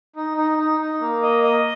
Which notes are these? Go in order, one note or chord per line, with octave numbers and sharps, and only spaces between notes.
D#4
D#4
D#4
D#4
A#3
D#5
D#5